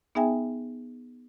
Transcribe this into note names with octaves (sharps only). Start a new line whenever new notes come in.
B3 D#4 G#4 E5 G5 G#5